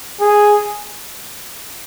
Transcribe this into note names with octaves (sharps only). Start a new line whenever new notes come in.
G#4